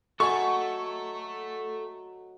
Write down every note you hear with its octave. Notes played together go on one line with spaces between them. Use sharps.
F#3 A3 F#4 A4 D#5 G#5 C#6